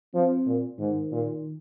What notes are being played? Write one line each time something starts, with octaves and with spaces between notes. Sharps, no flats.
F3 C4
A#2
G#2 D#3
A#2